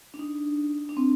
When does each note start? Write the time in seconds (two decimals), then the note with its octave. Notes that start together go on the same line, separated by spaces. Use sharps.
0.14 D4
0.19 D#4
0.89 D4
0.97 C4